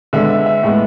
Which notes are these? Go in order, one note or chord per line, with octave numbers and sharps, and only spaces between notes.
D3 G#3 B3 E5
E5
E5
A2 G#3 B3